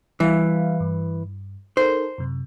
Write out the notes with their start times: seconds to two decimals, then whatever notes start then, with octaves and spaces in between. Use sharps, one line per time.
0.20 E3 G3 E5 F5
0.80 G2
1.77 D#4 A4 A#4 C5
2.18 F#2 C3